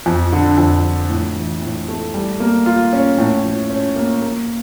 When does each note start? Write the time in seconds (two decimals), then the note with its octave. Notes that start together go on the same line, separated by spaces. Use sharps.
0.06 F2
0.33 D3
0.58 F2
0.84 F3
1.10 A2
1.36 E3
1.62 A2
1.88 A3
2.14 G3
2.40 A#3
2.66 F4
2.93 C#4
3.18 A2
3.45 F3
3.70 C#4
3.96 A#3
4.22 A#3